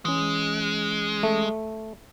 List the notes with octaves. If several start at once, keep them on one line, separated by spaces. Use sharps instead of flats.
E3 G#3 C#4
A3